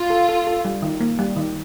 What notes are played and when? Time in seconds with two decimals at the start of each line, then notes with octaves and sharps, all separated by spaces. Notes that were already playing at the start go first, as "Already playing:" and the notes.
Already playing: F4
0.10 A4
0.29 A4
0.47 A4
0.65 G3
0.82 D#3
1.01 A#3
1.19 G3
1.36 D#3